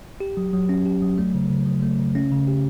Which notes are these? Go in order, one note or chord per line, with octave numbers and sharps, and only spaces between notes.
G4
F#3
F#3
C#4
G4
F#3
A3
C#3
C#3
F#3
A3
C#3
C#4
C#3
G4